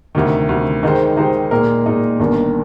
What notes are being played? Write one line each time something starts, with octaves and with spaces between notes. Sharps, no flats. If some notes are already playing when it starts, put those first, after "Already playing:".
D2 C3 D#3
D2 C3 D#3
D#3 G#3 D#4 G4 C5
D#3 G#3 D#4 G4 C5
A#2 G#3 D#4 A#4
A#2 G#3 D#4 A#4
G1 G2 D#3 A#3